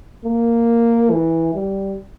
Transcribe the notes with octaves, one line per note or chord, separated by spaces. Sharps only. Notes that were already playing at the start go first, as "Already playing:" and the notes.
A#3
E3
G3